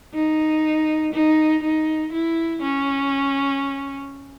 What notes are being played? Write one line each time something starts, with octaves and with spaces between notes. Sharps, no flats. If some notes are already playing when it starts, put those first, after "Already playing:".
D#4
D#4
D#4
E4
C#4